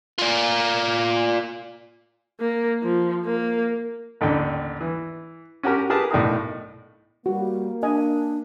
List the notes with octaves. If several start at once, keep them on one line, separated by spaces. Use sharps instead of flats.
F4 D5
A#3
F3
A#3
A1 D#2 D3 G5
E3
C#4 F#4 G4 A#4
G4 G#4 A#4 B4 A5
B1 A2 D4 D#4 A#4 D#6
G3 A#3 F#4
D4 D#5 G#5